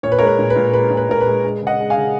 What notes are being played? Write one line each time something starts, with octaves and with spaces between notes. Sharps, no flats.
A#2 C#5
B4
G#3 A#4 C#5
B4
A#2
B4
A#2
G#3 B4
A#2
B4
A#2 A#4
B4
G#3
G#3
C#3
D#5 F#5
G#3
F5 G#5
C#3